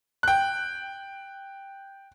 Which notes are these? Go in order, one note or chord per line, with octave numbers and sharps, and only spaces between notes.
G5 F#6